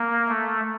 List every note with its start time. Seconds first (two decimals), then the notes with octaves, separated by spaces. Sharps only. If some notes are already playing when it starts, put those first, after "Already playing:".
Already playing: A#3
0.28 A3